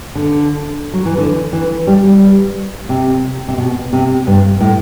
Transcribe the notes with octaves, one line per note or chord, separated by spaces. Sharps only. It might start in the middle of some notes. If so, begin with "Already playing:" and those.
D3
F#3
E3
D3
E3
G3
G3
C3
C3
B2
C3
G2
A2